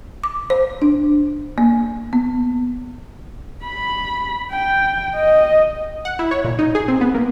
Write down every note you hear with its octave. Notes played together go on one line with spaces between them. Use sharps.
D6
C5
D4
A#3
B3
B5
G5
D#5
F#5
E4
C#5
A#2
D#4
G#4
C4
B3
A#3